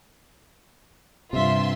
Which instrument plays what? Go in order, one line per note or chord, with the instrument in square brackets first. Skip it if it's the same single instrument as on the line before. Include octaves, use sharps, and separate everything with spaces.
[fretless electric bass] G2 C3 [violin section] F4 E5 C6